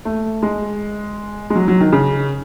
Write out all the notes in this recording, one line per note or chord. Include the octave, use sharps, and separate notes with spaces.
A3
G#3
G#3
F#3
F#3
D#3
C#3